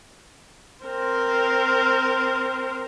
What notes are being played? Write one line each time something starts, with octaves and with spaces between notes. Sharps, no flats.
C4 A#4